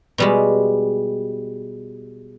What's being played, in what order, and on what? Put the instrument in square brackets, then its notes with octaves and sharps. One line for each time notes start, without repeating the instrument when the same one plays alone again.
[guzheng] B2 G3 G#3